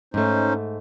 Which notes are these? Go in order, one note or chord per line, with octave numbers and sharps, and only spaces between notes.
G#2 A3 C#4 D#4 C5